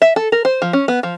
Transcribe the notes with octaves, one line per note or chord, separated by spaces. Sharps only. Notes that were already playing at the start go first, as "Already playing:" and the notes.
E5
A4
A#4
C5
F3
C#4
B3
F3